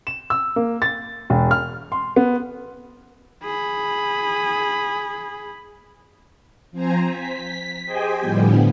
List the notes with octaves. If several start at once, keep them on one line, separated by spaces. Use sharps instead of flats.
E7
E6
A#3
A6
E1
F6
C6
B3
G#4 B5
F3 C4 C5 G#5 A#5
B6
G4 G#4 C5 D#5 G5 G#5
A2 D3 F3 G3 B3